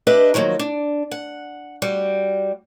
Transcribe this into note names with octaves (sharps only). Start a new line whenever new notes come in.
D4 G4 B4 D#5 E5
D#3 F3 F#3 A#3
D4
F#5
G3 F#4